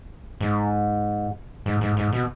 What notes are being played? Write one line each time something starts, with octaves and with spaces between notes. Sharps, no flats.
G#2
G#2
G#2
G#2
B2